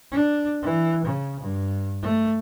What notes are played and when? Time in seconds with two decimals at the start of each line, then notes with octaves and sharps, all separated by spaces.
0.12 D4
0.63 E3
1.05 C#3
1.40 G2
2.03 A3